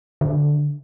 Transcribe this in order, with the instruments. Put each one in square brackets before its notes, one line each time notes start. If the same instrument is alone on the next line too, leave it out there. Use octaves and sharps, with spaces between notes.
[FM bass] D3